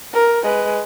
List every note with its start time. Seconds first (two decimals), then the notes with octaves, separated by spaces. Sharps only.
0.13 A#4
0.43 G#3 B4